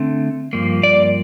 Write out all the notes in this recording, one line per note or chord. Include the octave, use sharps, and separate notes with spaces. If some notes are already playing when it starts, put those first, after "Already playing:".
Already playing: D3 A3 C4
G2 F3 A#3
D5